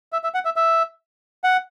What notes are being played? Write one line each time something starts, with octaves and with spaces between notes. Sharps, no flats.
E5
E5
F#5
E5
E5
F#5